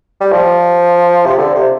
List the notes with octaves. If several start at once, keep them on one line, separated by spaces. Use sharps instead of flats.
G3
F3
C3
D3
C3